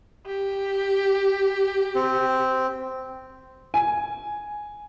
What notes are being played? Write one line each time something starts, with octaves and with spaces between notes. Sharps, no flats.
G4
C4
G#5